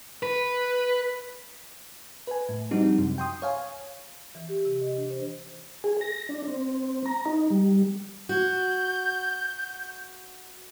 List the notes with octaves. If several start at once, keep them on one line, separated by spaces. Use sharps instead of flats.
B4
B4 G#5
A2
F3 G3 C4 D4 D#4 F#4
F#2 C3
G5 C6 D#6
C#5 F5 G#5
E3
G4
C3
D#5
D4
C5
G#4
A#6
D4
C4
A#5
D#4
G3
F#4 G6